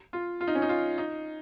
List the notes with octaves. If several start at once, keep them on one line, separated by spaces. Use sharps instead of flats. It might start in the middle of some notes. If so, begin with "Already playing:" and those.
F4
F4
D#4
C#4
D#4
F4
D#4